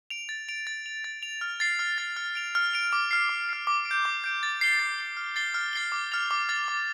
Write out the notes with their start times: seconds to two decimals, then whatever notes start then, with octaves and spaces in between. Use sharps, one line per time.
0.10 D7 F7
0.29 A6
0.49 D7 F7
0.67 A6
0.86 F7
1.04 A6
1.23 F7
1.41 F6
1.60 A6 C7
1.79 F6
1.98 A6 C7
2.17 F6
2.35 D7 F7
2.55 F6
2.73 D7 F7
2.93 D6
3.11 F6 C7
3.29 D6
3.49 F6 C7
3.67 D6
3.85 D7
3.91 G6
4.05 D6
4.24 G6 D7
4.43 A6
4.61 C7 G7
4.79 A6
4.98 C7 G7
5.17 F6
5.36 A6 C7 G7
5.54 F6
5.73 A6 C7 G7
5.92 D6
6.12 F6 A6 F7
6.31 D6
6.49 F6 A6 F7
6.68 D6